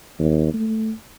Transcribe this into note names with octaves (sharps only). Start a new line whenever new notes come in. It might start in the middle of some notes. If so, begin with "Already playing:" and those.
D#2
A3